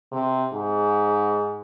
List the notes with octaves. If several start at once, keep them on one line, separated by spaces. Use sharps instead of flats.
C3
G#2